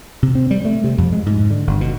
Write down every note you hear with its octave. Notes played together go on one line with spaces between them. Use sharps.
C3
C4
G3
A3
C3
F2
G#3
G#2
D3
G1
B2